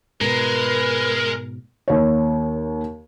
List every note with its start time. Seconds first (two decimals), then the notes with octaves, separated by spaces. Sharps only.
0.21 G#2 B2 G#3 A#4 B4
1.88 D#2 C#5